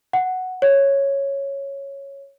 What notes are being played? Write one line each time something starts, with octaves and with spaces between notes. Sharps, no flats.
F#5
C#5